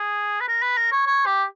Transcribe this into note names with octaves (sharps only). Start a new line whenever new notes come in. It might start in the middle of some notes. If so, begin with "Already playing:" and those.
Already playing: G#4
B4
A#4
B4
A#4
C#5
C#5
G4